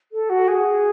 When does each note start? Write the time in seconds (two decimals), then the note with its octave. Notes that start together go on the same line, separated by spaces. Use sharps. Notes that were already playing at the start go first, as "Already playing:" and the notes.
0.12 A4
0.29 F#4
0.48 G#4